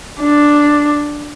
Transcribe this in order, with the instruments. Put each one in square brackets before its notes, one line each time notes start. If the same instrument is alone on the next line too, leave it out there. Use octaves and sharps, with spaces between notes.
[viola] D4